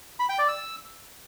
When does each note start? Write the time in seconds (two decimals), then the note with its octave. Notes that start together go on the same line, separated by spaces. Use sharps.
0.19 B5
0.29 G5
0.39 D5
0.48 E6